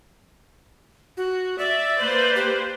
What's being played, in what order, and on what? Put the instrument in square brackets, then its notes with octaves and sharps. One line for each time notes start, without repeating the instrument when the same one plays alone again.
[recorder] F#4
[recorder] D5 [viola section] E5
[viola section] A#3 B4 C5
[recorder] G4